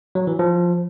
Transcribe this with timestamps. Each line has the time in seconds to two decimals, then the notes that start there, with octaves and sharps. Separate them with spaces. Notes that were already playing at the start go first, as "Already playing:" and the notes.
0.15 F#3
0.27 E3
0.39 F3